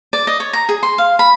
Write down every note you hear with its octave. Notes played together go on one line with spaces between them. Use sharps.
D5
D#5
C#5
A#5
G#4
C6
F5
B5